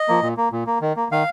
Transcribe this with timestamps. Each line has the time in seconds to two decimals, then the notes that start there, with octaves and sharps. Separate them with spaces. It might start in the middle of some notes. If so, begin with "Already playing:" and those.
Already playing: D#5
0.08 F3 A#3
0.22 A#2
0.37 A#3
0.52 A#2
0.67 A#3
0.81 D#3
0.96 A#3
1.12 D#3 F5